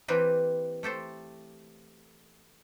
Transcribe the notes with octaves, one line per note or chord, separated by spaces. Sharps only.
E3 A#3 C4 G4 B4
A3 G4 A4 C5